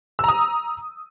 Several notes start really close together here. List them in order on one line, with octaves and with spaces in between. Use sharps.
E6 A#5 D#6